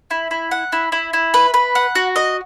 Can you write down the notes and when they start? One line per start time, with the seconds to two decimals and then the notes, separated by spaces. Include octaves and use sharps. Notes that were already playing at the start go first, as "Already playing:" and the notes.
0.11 E4
0.31 E4
0.51 F#5
0.72 E4
0.92 E4
1.13 E4
1.34 B4
1.54 B4
1.75 F#5
1.95 F#4
2.16 D#5